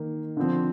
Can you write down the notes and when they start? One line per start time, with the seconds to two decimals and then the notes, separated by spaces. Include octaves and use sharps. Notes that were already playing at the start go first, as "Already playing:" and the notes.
Already playing: D#3 A#3
0.37 D3 F3 C4